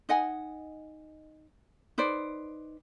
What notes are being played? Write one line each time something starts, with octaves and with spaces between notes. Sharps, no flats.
D#4 D#5 F#5 G#5
D#4 B4 C5 D5